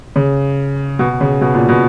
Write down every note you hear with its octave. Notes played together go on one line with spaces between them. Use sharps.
C#3
B2
C#3
B2
A#2
B2